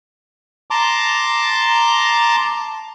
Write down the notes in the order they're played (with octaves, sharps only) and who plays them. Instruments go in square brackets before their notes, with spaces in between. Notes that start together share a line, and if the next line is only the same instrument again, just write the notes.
[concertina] A5 A#5 C6 D6